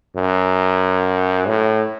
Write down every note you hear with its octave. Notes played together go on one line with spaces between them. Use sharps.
F#2
A2